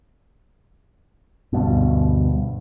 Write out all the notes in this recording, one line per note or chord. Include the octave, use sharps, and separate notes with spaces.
D2 G2 B2